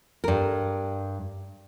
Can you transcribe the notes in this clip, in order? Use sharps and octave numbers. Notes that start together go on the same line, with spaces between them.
G2 A#4